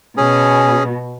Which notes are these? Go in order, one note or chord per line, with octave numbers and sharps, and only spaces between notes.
B2 C#4 G#4